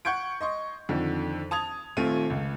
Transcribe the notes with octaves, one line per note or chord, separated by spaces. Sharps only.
F#5 C#6 G6 G#6 D7
D#5 C6 C#6
F2 D3 D#3 D4
A5 D#6 G#6 F7
D#1 A3 C4 F4 D#7
C#2